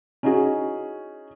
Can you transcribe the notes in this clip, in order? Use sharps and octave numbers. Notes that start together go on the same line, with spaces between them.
C#4 D#4 E4 F#4 G#4